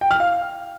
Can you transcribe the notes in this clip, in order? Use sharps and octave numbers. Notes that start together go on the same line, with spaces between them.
G5
F6
F5